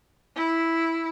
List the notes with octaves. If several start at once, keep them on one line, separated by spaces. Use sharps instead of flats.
E4